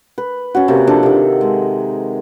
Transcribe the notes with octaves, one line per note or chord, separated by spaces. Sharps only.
B4
C#4 F#4
C3 A#3
F3 D4 A4
C3 D#3
G#3